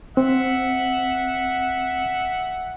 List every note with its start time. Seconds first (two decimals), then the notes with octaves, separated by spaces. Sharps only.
0.17 C4 E5 F#5